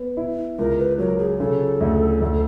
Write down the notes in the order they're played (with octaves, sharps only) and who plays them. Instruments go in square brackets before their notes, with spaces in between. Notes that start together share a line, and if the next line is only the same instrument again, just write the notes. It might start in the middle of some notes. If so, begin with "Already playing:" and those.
Already playing: [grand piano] B3
E4
[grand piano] C#2 [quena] A#4
[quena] B4
[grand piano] F#3 [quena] A#4
[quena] G#4
[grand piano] C#3 [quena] A4
[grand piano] D2
D2